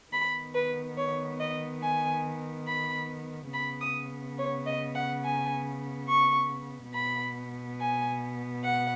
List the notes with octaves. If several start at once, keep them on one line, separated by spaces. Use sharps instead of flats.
D#3 B3 B5
B4
C#5
D#5
G#5
B5
C#3 B3 B5
D#6
C#5
D#5
F#5
G#5
C#6
B2 B3 B5
G#5
F#5